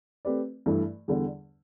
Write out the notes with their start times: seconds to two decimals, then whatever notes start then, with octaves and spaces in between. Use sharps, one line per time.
0.25 A3 C4 G4 B4 D5
0.66 G2 E3 A3 E4
1.08 E2 D3 G3